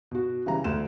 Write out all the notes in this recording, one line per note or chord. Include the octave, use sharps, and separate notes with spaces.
B2 F#4
C#3 E3 G3 A#5
D2 E7